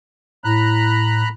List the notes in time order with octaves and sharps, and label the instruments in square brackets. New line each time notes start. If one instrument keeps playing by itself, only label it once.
[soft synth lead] A2 [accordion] A#5 B5 F#6